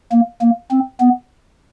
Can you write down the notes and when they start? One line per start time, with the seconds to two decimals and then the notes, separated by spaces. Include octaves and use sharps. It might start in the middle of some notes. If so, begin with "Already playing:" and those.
0.12 A#3
0.41 A#3
0.71 C4
1.01 B3